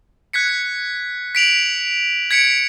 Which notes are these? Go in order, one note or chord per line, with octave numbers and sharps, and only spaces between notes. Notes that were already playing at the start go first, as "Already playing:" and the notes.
F#6 G#6 B6 C#7
B6 D7 F7 F#7
G#6 B6 C#7 D7 F7